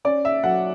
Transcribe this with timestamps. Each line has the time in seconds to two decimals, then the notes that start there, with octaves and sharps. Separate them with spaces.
0.05 C#4 D5
0.25 E5
0.44 F#3 F#5